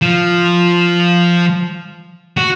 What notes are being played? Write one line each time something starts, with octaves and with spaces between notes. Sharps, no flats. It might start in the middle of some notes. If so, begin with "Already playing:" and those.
F3
F#4